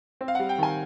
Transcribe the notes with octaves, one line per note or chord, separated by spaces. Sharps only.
C4
F5
G3 F#5
G5
D#3 G#5